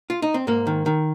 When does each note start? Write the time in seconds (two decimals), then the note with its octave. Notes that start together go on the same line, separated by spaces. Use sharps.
0.10 F4
0.22 D#4
0.34 C4
0.47 G#2 A#3
0.67 D#3
0.86 D#3